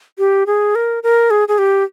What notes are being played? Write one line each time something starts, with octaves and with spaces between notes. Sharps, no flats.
G4
G#4
A#4
A#4
G#4
G#4
G4